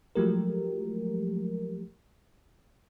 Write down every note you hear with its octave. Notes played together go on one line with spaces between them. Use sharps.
F3 F#3 G#3 A3 G4 A#4